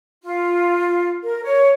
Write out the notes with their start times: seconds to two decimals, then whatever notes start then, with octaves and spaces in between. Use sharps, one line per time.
0.23 F4
1.23 A#4
1.44 C#5